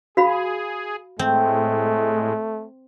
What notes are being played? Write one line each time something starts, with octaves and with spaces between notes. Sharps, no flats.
F#4 G#4 F5 B5
A2 G#3 A3 C4